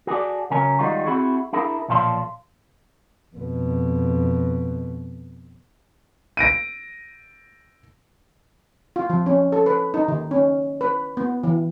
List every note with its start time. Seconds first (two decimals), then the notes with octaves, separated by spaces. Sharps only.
0.07 F#4 G#4 A4 D5
0.51 C#3 F#3 C#4 A#4 G#5
0.79 D#3 G3 G#3 D#4 F4 F#4
1.05 C4 D#4 E4 F#4 G#4 F#5
1.53 D4 E4 G#4 A#4
1.88 B1 A#2 F3 F5 A5 C6
3.36 F2 B2
6.37 A#6 D7 D#7
8.96 F4
9.10 F3
9.26 C#4
9.52 A4
9.66 B4
9.94 D#4
10.08 D#3
10.31 C#4
10.81 B4
11.17 B3
11.44 E3